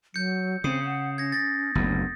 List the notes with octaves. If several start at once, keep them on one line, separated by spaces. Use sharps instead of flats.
F#3 G6 C#7
C#3 C4 D#6 C7
F#5
C#4 G#6 A#6
A6 A#6
F#1 D2 B3